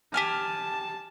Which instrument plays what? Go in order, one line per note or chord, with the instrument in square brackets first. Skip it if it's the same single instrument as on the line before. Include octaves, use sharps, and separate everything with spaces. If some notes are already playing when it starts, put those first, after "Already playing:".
[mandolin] G4 G#5 F6 [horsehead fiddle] A5